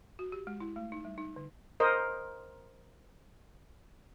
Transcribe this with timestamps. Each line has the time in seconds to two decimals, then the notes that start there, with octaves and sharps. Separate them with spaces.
0.19 F#4
0.32 G4
0.47 G#3
0.60 E4
0.76 A3
0.92 D#4
1.05 G3
1.18 D#4
1.36 D3
1.80 A#4 C5 D#5